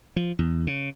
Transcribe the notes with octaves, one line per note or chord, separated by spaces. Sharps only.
F3
E2
C#3